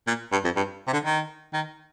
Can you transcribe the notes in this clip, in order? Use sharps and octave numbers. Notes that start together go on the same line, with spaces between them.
A#2
G2
F2
G2
C3
D3
D#3
D#3